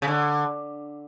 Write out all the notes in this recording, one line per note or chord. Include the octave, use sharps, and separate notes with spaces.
C#3
D3